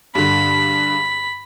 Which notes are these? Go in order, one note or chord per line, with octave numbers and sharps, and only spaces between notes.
G2 D3 B5